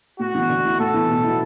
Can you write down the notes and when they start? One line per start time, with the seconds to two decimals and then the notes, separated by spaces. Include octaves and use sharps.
0.19 A2 F#4
0.35 E3 B3
0.50 D3
0.64 A3 E4
0.79 A2 A4
0.94 E3 B3 E4
1.09 B2
1.24 F#3 B3 E4